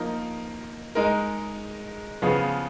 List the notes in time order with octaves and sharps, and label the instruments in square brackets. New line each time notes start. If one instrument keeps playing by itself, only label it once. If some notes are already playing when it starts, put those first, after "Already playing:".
Already playing: [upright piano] F3 A#3 D#4 A#4
G#3 D#4 A#4
C#3 F3 B3 F4 G#4